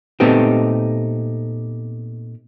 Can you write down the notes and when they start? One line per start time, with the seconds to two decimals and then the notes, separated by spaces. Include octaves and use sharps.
0.20 A#2 A3 B3 C4 D#4 G4